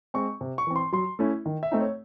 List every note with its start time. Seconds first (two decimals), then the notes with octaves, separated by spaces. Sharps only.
0.14 G#3 C4 C#6
0.41 C3
0.58 C#6
0.67 E3 C4
0.76 C6
0.93 F#3 C6
1.19 A3 C#4 E4
1.46 D#3
1.63 E5
1.71 A3 C4 D#4
1.80 C#5